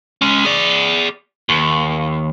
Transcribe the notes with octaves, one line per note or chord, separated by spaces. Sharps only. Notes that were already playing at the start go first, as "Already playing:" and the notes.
G#3 C#4
G#4 D5
D#2